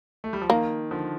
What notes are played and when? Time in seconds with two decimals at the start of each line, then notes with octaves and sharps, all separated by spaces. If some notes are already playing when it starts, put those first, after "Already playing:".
0.24 A3
0.33 G3
0.42 F3
0.50 D#3 A#3
0.91 D3 F3